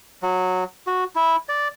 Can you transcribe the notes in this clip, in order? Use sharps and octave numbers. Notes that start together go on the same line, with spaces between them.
F#3
F#4
E4
D5